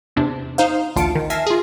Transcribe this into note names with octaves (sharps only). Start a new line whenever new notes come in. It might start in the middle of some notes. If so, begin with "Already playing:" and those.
E2 C3 D4
D#4 C5 F5
A1 D2 F4 A5 C#7 D7
D#3
E5 G#5 A5 F6 A#6 C7
F4 G#4